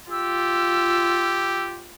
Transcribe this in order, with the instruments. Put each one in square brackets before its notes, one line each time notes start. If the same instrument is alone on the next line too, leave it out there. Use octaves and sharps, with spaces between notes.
[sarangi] F4 [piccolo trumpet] G4 [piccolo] E6